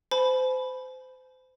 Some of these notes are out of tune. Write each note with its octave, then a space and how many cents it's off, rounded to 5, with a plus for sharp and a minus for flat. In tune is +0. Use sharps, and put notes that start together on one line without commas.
C5 -30 G#5 +45 B5 +0